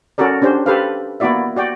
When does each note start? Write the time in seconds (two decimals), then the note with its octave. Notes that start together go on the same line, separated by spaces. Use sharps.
0.18 C#4 F#4 A4 A#4 D5
0.42 C#4 D4 G4 C5
0.66 G4 A4 B4 C5 F5
1.20 A#3 B3 E4 F#4 D5 E5
1.56 F#4 D5 G5